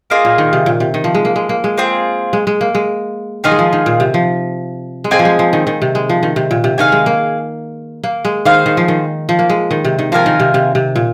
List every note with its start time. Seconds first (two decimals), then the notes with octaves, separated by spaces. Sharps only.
0.10 A#3 F4 G#4 D#5
0.25 A#2
0.38 D#3
0.53 C3
0.66 A#2
0.80 C3
0.94 D#3
1.04 F3
1.15 G#3
1.25 A#3
1.36 G#3
1.49 A#3
1.64 G#3
1.78 C4 F4 G#4
2.33 G#3
2.47 G#3
2.61 A#3
2.75 G#3
3.44 D#3 F4 G#4 D#5 G#5
3.51 G#3
3.59 F3
3.73 D#3
3.86 A#2
4.00 C3
4.14 F3
5.04 G#3
5.11 A#3 C4 G#4 D#5 G#5
5.19 F3
5.25 G#3
5.39 F3
5.53 D#3
5.67 D#3
5.82 C3
5.95 G#3
6.09 F3
6.23 D#3
6.36 C3
6.51 A#2
6.64 C3
6.78 D#3 G#4 F5 G#5
6.92 G#3
7.06 A#3
8.04 A#3
8.25 G#3
8.45 D#3 G#4 C5 F5
8.66 D#3
8.77 F3
8.88 D#3
9.29 F3
9.39 A#3
9.50 G#3
9.71 D#3
9.85 C3
9.99 D#3
10.12 F3 F4 A#4 G#5
10.26 D#3
10.40 C3
10.54 C3
10.75 C3
10.96 A#2